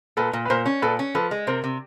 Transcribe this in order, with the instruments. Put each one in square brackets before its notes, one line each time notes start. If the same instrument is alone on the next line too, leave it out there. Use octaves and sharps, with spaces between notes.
[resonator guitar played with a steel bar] A#2 [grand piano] A4 B4
[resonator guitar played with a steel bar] A#2
[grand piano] B4
[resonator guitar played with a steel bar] A#2 [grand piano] A#4 C5
[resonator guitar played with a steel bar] C#4
[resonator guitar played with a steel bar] A#2 [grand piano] A4 B4
[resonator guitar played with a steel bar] C#4
[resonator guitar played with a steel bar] F3 [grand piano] A4 B4
[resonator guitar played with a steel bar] G#3
[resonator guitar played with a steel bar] C3 [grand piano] A#4 C5
[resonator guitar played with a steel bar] C3